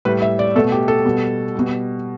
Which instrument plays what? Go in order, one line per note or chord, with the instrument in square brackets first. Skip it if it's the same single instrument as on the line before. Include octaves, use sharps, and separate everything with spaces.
[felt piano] A2 G3 B4
E5
D5
B2 A3 A4
G4
A4
B2 G3
B2 G3